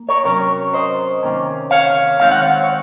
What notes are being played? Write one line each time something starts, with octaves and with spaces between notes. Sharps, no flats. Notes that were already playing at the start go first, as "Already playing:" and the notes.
Already playing: A#3
A#4 C#5
C3 F#3 C#4 A#4 C#5
C5 D#5
C3 D#3 A#3 C#4
C#5 F5
D#3 G#3 C4 D#4 F5
F#5
C#5 F5
C#5